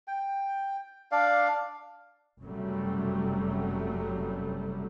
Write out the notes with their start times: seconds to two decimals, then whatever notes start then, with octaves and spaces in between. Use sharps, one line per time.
0.08 G5
1.12 D4 D5 F5
2.42 F#1 F#2 C3 F#3 G3 A3